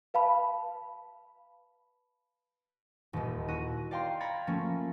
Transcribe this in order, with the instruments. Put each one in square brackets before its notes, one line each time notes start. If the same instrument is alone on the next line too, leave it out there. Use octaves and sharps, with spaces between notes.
[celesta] B4 F5 A5 B5
[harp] D#1 D#2
E4 F#4 D#5 F#6 D#7
D5 F5 G5 A#5 C6
A#5 B5 G#6 A6 C#7
F3 A3 A#3 C#4